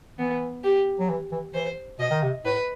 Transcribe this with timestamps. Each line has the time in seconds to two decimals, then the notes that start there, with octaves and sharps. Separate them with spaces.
0.19 E3 B3
0.64 G4
0.99 F#3
1.09 E3
1.32 E3
1.54 E3 C5
1.99 B2 D#5
2.11 D#3
2.23 C3
2.45 A2 B4